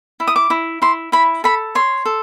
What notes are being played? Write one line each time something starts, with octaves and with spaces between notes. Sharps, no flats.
E4
D#6
D6
E4
E4 C6
E4 B5
A4 B5
C#5 C6
A4